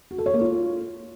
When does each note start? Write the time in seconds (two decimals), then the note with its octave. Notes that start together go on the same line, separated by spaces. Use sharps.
0.11 F#4
0.18 A4
0.26 C#5
0.34 A#3
0.41 F4